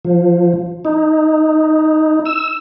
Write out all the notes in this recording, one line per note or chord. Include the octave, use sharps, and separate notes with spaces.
F3
D#4
E6